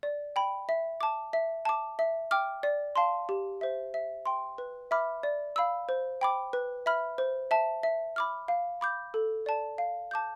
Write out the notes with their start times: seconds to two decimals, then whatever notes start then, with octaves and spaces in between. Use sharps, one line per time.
0.03 D5
0.36 G5 B5
0.69 E5
1.01 A5 D6
1.33 E5
1.65 A5 D6
1.99 E5
2.31 G5 D6 F6
2.63 D5
2.96 F5 A5 C6
3.29 G4
3.61 C5 E5
3.94 E5
4.26 G5 C6
4.58 B4
4.91 E5 B5 D6 F6
5.23 D5
5.56 F5 B5 E6
5.89 C5
6.21 G5 B5 D6
6.53 B4
6.86 E5 B5 F6
7.18 C5
7.51 E5 A5
7.83 E5
8.16 B5 D6 F6
8.48 F5
8.81 B5 D6 G6
9.14 A4
9.46 D5 A5
9.78 F5
10.11 A5 D6 G6